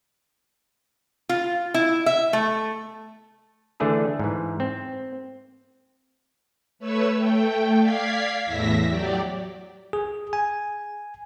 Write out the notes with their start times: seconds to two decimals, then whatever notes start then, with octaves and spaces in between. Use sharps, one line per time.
1.29 F4
1.74 E4
2.06 E5
2.33 A3
3.80 D3 E3 A3 D4 G#4 A4
4.19 G#2 E3
4.60 C4
6.79 A3 B4 C#5 E6
7.15 A3 G5
7.79 D5 F5 G#6 B6 C7
8.44 E2 A2 E5 A#6 B6
8.88 F#3 G4 D5
9.93 G#4
10.33 G#5